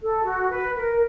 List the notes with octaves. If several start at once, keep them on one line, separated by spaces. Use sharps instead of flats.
A4
F#4
B4
A#4